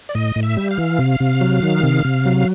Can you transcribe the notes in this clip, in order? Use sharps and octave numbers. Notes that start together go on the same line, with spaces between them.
D5
A2 D#5
A2
E5
G3
F5
E3
C3
C3
F#3
D#3
C3
C3
F#3